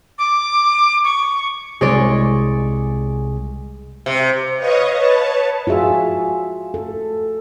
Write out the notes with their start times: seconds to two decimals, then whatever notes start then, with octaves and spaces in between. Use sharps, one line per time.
0.18 D6
1.03 C#6
1.81 C2 G#3 G#4 C#5 D5
4.06 C3
4.57 B4 C#5 D#5 F5 C#6 D#6
4.93 B4 C#5 A5
5.67 F4 F#4 G#4 E5
6.74 A4